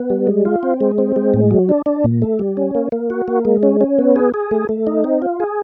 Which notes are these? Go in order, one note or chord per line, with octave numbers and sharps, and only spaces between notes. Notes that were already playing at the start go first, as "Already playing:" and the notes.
Already playing: B3
G3
G#3
F4
C4
G#3
C4
G#3
A2
F#3
D4
D4
A#2
A3
G3
C#4
A#3
A#3
F#4
A#3
G#3
C#4
C#4
B3
G#4
G#4
A3
A3
D#4
C4
F4
G#4